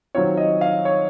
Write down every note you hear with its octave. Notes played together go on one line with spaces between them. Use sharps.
D#3 F#3 C4 F4 C#5
D#5
F5
C#5